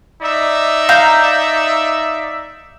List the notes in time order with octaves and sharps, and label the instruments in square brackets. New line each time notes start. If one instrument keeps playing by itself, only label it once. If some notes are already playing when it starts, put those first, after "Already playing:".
[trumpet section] D#4 D5 E5
[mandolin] F5 A#5 G6